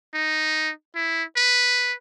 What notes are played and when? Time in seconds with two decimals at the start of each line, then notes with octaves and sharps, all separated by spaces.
0.14 D#4
0.95 E4
1.37 B4